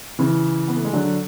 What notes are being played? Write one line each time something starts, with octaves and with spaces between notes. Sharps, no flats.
C#3 E3
B3
A3
G#3
D3 F#3